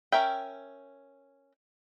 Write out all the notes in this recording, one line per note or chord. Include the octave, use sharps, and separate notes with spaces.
C#4 A#4 E5 G5